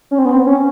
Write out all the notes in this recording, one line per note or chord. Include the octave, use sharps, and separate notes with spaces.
C#4
C4
B3
C4
C#4